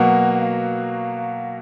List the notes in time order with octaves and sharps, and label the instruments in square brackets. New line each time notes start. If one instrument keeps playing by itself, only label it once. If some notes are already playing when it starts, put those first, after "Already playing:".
Already playing: [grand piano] B2 F#3 A#3 [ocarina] F#5
[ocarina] F#5
F5